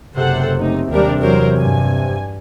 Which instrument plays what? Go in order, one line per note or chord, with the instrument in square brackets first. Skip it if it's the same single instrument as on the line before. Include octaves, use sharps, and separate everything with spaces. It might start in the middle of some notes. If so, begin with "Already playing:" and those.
[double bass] F#1 [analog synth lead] C3 [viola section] A4 C5 F#5
[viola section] A3 D#4
[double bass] D#2 G3 [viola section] D4 G4 A#4
[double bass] E2 F#3 [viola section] A#4 C5
[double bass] G2 [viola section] G#5